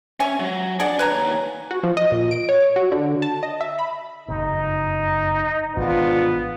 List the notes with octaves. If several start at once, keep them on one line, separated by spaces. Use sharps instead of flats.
C#4 E5 G#5 C#6
F#3
D4 G#4 D5 F#5
D#2 B4 C#5 G#5 A#5
F#4
F3
D#5
A#2
D7
C#5
F#4
D3
A5
D#5
E5
B5
F#1 F2 G#2 D#4
G#1 G#2 B2 E3 B3 D4 F4